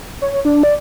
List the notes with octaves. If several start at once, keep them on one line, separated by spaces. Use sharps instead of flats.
C#5
D4
D5